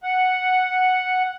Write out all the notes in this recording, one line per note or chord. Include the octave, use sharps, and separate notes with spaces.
F#5